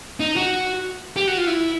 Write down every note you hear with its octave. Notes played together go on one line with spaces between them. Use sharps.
D#4
F#4
G4
F#4
F4
E4